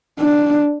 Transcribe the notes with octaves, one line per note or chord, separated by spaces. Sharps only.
D4